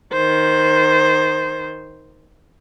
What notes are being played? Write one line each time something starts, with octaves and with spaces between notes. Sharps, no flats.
D#3 C5